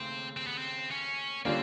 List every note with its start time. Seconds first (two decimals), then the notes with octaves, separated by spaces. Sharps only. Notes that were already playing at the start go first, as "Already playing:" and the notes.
Already playing: D#2 C#3 A3 C4
0.37 C4
0.47 B3
0.58 C4
0.91 C#4
1.45 D3 G3 A#3 C4 C#4 F4